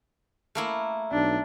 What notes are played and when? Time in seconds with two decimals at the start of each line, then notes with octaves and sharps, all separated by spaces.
0.55 A3 A#3 E4
1.12 B1 D4